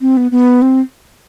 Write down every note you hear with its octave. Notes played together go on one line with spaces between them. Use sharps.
C4
B3
B3
C4